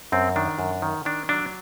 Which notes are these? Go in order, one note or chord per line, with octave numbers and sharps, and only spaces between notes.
F#2 C4
D#3 D4
F#2
D#3
D#3 D4
F#3 D4